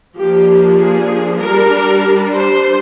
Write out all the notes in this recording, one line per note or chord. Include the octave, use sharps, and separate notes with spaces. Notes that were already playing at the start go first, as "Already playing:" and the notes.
F3 A#3 D4 G4
G#4
G3 D4 A#4
C5